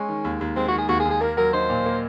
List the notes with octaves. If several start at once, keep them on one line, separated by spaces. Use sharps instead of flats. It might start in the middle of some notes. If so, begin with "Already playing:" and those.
Already playing: G#3 C#4
D#3
D#2
D#2
G#3 C4
F#4
D#3
G#4
D#2 F#4
G#4
D#2
G#4
A#3 A#4
F#3 A#4
D#4 C5
A#2
A#3